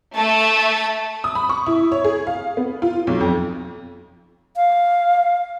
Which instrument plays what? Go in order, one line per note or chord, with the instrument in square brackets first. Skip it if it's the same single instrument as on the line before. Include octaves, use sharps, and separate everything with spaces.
[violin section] A3 [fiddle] A5
[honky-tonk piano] D#6
B5
C#6
E4
C#5
G#4
F5
B3
F4
B1
F2
[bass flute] F5